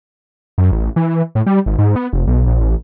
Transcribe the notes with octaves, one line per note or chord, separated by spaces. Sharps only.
F#2
A1
E3
A2
G3
G#1
G#2
B3
F1
B1
A#1
A1